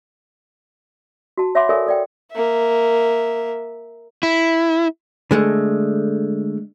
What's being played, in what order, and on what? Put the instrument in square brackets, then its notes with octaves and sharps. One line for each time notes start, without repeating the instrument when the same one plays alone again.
[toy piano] F#4 A5
C#5 E5 F#5 B5 C6 D6
A4 A#4 C#5 D5 E5 G#5
A4 D5 G5
[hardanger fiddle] A#3 E5
[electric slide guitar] E4
[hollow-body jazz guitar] D3 G#3 A3